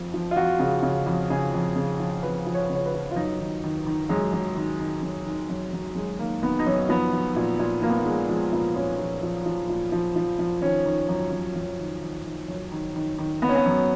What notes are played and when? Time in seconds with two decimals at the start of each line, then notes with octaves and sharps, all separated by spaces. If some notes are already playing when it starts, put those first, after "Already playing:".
Already playing: F2 F3
0.14 F3
0.31 F4
0.36 F2 F#4
0.59 C#3
0.83 C#3
1.06 F2
1.30 C#3 G#4
1.54 F2
1.76 C#3
1.99 F3
2.23 F2 B4
2.46 F3
2.54 C#5
2.70 C#3
2.75 C#5
2.86 B4
2.94 F3
3.11 F4
3.16 F#2 D#4
3.40 D#3
3.64 D#3
3.86 D#3
4.09 F#2 G#3
4.33 F#2
4.56 D#3
4.80 D#3
5.02 F#2
5.26 D#3
5.50 F#2
5.73 F#2
5.95 F#2 G#3
6.19 D#3 A#3
6.42 D#3 B3
6.59 D#4
6.66 F#2 C#4
6.89 F3 B3
7.13 F3
7.36 A#2
7.59 A#2
7.82 F3 A#3
7.90 B3
7.97 A#3
8.05 F3 G#3
8.29 F3 G#3
8.53 A#2 B3
8.76 A#2 C#4
8.99 F3
9.23 F3
9.46 F3
9.69 A#2
9.92 F3
10.16 F3
10.39 F3
10.62 D#3 C#4
10.85 D#3
11.09 F#2
11.32 F#2
11.55 F#2
11.79 D#3
12.02 D#3
12.25 D#3
12.48 F#2
12.72 D#3
12.96 D#3
13.18 D#3
13.42 D#3 B3
13.49 C#4
13.56 B3
13.66 F#2